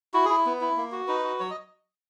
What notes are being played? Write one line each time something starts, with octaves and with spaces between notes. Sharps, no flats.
E4 F#4
E4 G#4
B3
E4
A#3
F#4
D#4 B4
F#4
F#3 C#5
D#5